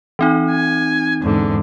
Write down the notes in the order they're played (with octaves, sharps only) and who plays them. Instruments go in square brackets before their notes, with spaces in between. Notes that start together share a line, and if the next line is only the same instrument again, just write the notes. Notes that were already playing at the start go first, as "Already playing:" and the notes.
[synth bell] E3 C4 D#4
[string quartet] G#5
E2 G#2 D3